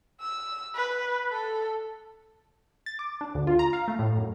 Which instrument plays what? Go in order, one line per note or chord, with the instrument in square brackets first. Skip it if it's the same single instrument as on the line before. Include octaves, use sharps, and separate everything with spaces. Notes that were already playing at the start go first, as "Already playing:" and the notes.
[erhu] E6
B4
A4
[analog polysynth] A6
D6
D4
D2
F4
A#5
F5
A3
A2
F#2